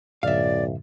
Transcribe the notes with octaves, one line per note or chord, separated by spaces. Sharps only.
B1 F#2 A2 D3 D5 E5 F5